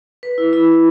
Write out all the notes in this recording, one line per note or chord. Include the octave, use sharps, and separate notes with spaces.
B4
E4
E4